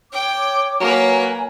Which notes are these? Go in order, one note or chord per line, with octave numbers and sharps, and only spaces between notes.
C#5 G5 D6
F#3 A#3 B4 C#5 G#5 A#5